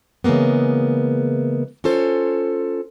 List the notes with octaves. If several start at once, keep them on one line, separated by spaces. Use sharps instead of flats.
C#3 E3 G#3 A#3 B3
C#4 F4 A4 C5